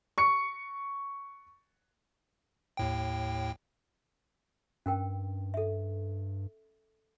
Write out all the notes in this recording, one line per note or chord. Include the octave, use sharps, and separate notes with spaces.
C#6 C#7
D#2 A2 G5
G2 C#4 A#4 G5
A4 E5